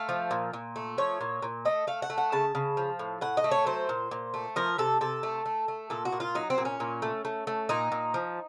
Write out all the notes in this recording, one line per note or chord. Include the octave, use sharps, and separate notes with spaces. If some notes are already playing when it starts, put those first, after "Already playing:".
Already playing: A3 F5
F3
A#2
A#2
A3
F3 C#5
A#2
A#2
A3 D#5
A3 F5
F#5
A3
F#5
C#3 A5
C#3
F3
A2
A2 F#5
D#5
A3
C#5
F#3 C5
A#2
A#2
A3
F3 A#4
C3 A4
C3 A4
A3
A3
A3
A#2 A4
F#4
A#2
F4
F#3 D#4
C4
A#2
C#4
A#2
A3
A3
A3
A#2 D#4
A#2
F3